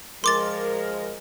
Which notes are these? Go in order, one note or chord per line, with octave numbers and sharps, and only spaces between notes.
F3 G#3 A#4 C6 D6 A6